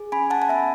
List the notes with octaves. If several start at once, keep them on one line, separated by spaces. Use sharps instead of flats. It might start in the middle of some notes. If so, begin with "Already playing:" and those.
Already playing: G#4
C#4 G#5 B5
F#5 A5
A5
B3 E5 G#5